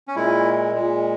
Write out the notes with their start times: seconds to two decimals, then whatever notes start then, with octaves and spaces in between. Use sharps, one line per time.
0.08 C#4
0.15 A#2 G#3 E4
0.73 A#2 G#3